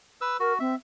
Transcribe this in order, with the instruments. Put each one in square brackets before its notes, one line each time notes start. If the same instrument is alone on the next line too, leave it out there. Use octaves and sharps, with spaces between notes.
[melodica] B4 E6
[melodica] F#4 [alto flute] A#4
[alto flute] C4 [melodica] E5